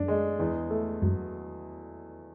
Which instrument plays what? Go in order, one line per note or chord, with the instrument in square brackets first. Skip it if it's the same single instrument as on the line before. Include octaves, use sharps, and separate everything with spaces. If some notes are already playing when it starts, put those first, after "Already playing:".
Already playing: [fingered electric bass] F#2 [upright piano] D4
[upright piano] G#3
E2
A3
[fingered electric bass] F#2 [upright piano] F#3